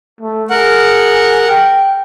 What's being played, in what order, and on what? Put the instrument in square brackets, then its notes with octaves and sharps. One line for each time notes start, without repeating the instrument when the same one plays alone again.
[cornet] A3
[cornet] G#4 [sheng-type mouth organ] A#4 F#5
[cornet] G5